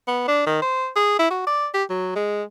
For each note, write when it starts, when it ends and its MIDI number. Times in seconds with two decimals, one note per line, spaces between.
0.08 0.24 59
0.28 0.44 62
0.47 0.61 51
0.62 0.88 72
0.96 1.14 68
1.19 1.30 64
1.31 1.42 66
1.47 1.68 74
1.74 1.84 67
1.90 2.14 54
2.16 2.44 56